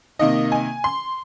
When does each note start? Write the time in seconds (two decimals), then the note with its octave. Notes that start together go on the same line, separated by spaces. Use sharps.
0.19 C3 D#3 A#3 D#4 D#5
0.52 G#5
0.84 C6